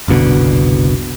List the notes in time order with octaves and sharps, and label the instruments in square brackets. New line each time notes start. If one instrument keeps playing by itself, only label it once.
[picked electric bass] F#1 C2 B2 D3